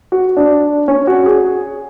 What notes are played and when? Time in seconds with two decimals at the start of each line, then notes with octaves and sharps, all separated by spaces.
0.12 F#4
0.37 D4
0.88 C#4
1.07 F#4
1.26 G#4